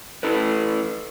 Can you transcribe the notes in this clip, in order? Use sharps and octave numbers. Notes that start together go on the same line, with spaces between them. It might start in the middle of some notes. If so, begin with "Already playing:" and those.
E4 A4 B4